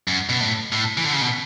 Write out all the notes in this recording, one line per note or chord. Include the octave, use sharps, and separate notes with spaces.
F#2
B2
A2
A2
E3
D3
C#3
B2